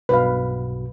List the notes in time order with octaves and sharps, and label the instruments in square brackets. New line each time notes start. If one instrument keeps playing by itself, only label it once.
[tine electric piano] B1 G2 B2 [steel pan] B4 F5